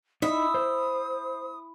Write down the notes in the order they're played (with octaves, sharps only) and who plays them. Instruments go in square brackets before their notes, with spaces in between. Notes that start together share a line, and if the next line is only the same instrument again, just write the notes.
[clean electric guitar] D#4 [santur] E4 [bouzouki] E5 [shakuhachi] D#6
[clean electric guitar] C5